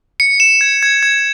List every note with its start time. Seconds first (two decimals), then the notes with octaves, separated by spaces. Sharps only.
0.20 C#7
0.40 E7
0.61 G#6
0.83 G#6
1.03 G#6